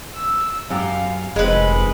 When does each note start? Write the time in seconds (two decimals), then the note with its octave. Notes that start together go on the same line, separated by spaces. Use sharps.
0.15 E6
0.70 F#2 G4 F5
1.36 F1 D#3 G#3 C4 B4 B5